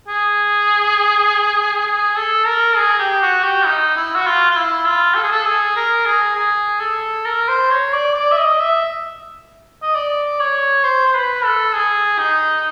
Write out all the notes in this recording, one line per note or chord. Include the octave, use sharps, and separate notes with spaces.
G#4
G#4
A4
A#4
G#4
G4
F#4
G4
D#4
E4
F#4
F4
F4
E4
F4
A4
G#4
A4
G#4
A#4
G#4
G#4
A4
A#4
C5
C#5
D5
D5
E5
D#5
E5
D#5
D5
C#5
C5
C5
B4
A4
G#4
D#4